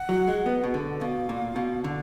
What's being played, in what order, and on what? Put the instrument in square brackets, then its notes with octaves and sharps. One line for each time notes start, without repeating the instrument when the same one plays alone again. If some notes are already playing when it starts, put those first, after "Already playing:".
Already playing: [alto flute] F#5
[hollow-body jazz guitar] F#3
G#3
B3
B2
D3
[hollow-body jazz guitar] B2 [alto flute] F5
[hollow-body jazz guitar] A#2
B2
D3